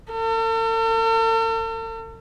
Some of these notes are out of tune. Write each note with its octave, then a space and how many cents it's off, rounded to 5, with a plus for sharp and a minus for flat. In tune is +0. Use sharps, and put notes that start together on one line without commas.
A4 +45